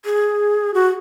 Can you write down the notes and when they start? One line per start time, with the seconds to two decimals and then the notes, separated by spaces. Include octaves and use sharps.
0.05 G#4
0.74 F#4